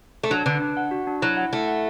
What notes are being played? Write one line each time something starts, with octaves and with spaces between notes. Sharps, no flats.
A3
F#3 D4
D3 B4
D4
F#5
F#4
D4
F#3 E4
F#5
A3 E4
F#5